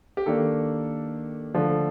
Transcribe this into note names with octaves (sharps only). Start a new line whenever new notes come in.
G4
D#3 A#3 D4 A4
D3 F3 A3 D4